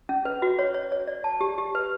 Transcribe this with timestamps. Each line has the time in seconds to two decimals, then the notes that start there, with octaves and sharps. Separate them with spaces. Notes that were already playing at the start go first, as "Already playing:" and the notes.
0.09 C#4
0.25 B4
0.42 F#4
0.59 C#5
0.74 C#5
0.92 C#5
1.07 D5
1.24 A5
1.41 G4
1.58 G4
1.75 B4